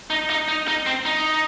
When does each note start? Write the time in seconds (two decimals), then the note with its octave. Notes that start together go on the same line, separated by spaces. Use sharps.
0.10 D#4
0.30 D#4
0.48 D#4
0.68 D#4
0.86 C4
1.05 D#4